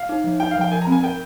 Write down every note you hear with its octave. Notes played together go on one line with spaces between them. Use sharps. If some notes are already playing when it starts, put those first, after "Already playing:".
Already playing: F5
D#4
F3
D#4 G5
F5
F3 G5
A#4 G#5
A#5
C4
G#5
A#4 G5